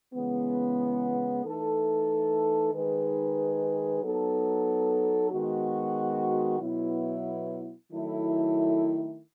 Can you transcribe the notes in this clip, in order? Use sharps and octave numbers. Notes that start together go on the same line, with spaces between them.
C#3 E3 G#3 B3
E3 A3 D#4 A4
D#3 G#3 D#4 G#4 B4
F#3 B3 D#4 A4
D#3 G#3 B3 F#4
B2 F#3 B3 E4
D#3 F#3 A3 E4 A4